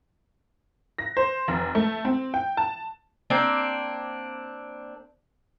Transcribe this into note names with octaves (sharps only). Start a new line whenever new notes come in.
A#6
C5
F1
A3
C4
G5
A5
A#3 C4 D4